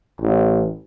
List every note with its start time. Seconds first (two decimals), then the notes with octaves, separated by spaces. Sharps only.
0.21 A1